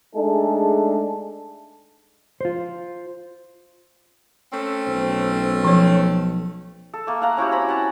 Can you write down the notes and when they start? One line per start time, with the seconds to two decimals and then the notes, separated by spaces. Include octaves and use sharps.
0.15 G#3 A3 D4 D#4 G#4 A4
2.41 F4 C5
4.53 A3 C4 C#4
4.87 B1 C5
5.65 F3 C#5
6.94 A4
7.07 A3 A#3
7.22 F5 F#5 A#5
7.37 C#4 E4 F#4 G4
7.51 C4 C#4 A#5 B5
7.69 F#5 A5